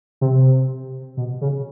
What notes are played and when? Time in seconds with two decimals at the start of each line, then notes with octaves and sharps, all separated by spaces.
0.21 C3
1.17 B2
1.41 C#3